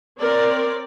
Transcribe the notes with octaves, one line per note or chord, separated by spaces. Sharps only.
C4 A#4 C#5 D5